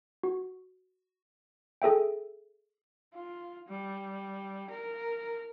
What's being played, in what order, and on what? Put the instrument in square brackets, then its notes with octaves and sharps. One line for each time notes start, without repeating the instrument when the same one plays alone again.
[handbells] F#4
G#4 A4 E5 G5
[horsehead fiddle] F4
G3
A#4